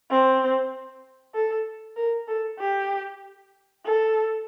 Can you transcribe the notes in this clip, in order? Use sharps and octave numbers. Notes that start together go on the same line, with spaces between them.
C4
A4
A#4
A4
G4
A4